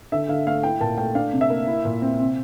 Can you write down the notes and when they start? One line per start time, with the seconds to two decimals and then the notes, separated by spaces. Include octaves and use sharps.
0.12 D3 E5
0.28 D3 F5
0.47 A3 F5
0.63 E4 G5
0.80 A#2 A5
0.98 A3 G5
1.15 D4 F5
1.33 C3
1.41 E5
1.50 A#3
1.67 E4
1.85 A#2
2.02 C4
2.20 C3